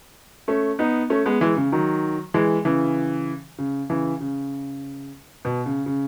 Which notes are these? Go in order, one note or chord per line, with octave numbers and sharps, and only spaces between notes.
A3 C#4
B3 D#4
A3 C#4
G#3 B3
E3 G#3
C#3
D#3 F#3
E3 G#3
C#3 E3
C#3
C#3 E3
C#3
B2
C#3
C#3